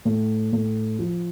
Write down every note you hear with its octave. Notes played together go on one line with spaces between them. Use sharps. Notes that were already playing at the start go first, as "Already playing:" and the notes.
A2
A2
F3